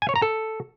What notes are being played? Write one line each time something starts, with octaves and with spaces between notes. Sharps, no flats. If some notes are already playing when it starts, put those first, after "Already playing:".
G#5
C#5
A#5
A4